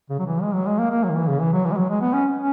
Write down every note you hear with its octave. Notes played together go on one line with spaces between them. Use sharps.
C#3
F#3
E3
G#3
F#3
G#3
A#3
A#3
F#3
D#3
E3
C#3
E3
F#3
E3
G#3
F#3
G#3
B3
C#4
C#4